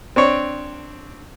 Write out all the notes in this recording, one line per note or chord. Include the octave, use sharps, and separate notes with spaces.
C4 D4 C#5